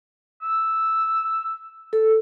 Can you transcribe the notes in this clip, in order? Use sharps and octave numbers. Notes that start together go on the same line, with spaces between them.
E6
A4